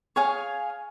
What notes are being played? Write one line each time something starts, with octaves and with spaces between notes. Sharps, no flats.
G#4 C#5 F5 G#5